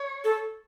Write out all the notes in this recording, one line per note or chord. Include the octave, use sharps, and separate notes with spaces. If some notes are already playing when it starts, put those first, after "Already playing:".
Already playing: C#5
A4